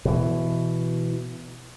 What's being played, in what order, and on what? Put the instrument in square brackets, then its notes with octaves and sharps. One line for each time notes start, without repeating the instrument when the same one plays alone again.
[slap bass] B2 E3